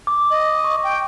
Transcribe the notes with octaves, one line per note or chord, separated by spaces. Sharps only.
D6
D#5
C#6
G5